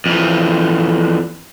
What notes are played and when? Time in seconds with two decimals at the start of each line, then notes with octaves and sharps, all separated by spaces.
0.06 F2 E3